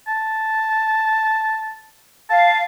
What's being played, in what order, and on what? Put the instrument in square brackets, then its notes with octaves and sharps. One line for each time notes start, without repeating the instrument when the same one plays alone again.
[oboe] A5
[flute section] F5 [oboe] A5